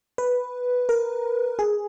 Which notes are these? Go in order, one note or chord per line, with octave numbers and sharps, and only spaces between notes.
B4
A#4
G#4